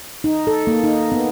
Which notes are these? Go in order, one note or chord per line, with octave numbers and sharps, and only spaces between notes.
D#4
A4
A#3
D#4
B3